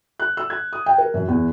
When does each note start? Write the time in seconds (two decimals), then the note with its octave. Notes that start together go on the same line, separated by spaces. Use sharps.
0.20 F#6
0.37 E6
0.50 G#6
0.73 D#6
0.86 G5
0.98 A#4
1.14 F#2
1.28 E2